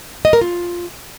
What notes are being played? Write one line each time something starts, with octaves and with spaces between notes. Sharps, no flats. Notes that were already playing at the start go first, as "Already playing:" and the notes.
D#5
A#4
F4